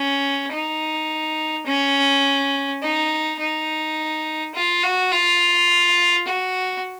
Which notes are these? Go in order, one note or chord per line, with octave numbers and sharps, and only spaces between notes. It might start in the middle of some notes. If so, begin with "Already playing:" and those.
Already playing: C#4
D#4
C#4
D#4
D#4
F4
F#4
F4
F#4